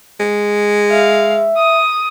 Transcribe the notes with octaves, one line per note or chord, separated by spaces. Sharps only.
G#3
E5 F5
D#6